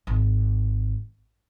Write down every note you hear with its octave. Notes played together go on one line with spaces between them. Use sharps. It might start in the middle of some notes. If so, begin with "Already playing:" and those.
G#1